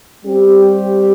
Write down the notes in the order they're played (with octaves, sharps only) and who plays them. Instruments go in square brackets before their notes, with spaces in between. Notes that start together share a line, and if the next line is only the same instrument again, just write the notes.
[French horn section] G3 C4 G4